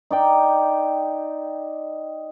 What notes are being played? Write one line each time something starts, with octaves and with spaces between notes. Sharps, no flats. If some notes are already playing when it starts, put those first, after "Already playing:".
D#4 D5 G5